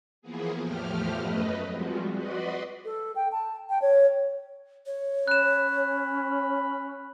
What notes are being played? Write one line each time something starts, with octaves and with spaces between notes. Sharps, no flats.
E3 F3 A#3 B3 G#4
E2 A2 F3 A3 G4 F6
F#2 A3 B4 D#5
F3 G3 G#3 C4 F4 F#4
F#4 B4 D5 D#5 B5 C6
A4
G5
A5
G5
C#5
C#5
C#4 B5 F#6 E7